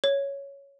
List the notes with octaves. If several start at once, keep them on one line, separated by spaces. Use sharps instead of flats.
C#5